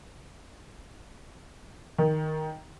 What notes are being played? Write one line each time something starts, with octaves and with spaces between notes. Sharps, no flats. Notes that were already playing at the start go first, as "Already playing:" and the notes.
D#3